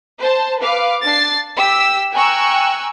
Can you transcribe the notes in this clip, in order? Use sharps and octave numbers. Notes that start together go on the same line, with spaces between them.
C5 A5
B4 F5 D6
D4 A6 C7
G4 E6 B6
G5 G#5 A#5 C#6 E6 F#6